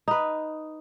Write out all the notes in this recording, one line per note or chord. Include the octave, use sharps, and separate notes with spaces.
D#4 B4